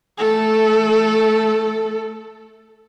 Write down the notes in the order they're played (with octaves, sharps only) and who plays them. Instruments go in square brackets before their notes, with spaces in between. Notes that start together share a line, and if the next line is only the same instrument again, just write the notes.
[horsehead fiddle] A3 A4